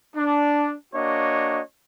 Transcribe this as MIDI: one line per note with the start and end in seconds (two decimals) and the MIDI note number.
0.16 0.73 62
0.94 1.60 58
0.94 1.60 62
0.94 1.60 66
0.94 1.60 73
0.94 1.60 75